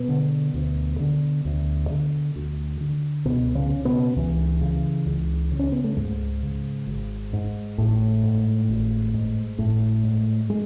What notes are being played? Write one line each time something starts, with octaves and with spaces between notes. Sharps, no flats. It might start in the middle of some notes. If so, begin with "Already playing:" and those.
Already playing: B2 B3
D3
D2
D3
D2
D3
D2
D3
C#2 B2 B3
C#3 C#4
C#3
B2 B3
C#2 E3
C#3
C#2
C#3
C#4
B3
A3
C#2 G#2 G#3
C#3
G#1
G#2
G#1 A2 A3
G#2
G#1
G#2
G#1 A2 A3
G#2
G#3